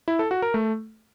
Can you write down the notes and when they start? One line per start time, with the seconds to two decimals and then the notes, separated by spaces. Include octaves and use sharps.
0.08 E4
0.19 A4
0.31 F#4
0.42 A#4
0.54 A3